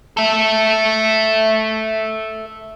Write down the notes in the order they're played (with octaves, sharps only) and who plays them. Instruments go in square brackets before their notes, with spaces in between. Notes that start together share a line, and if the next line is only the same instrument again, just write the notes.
[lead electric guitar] A4 E5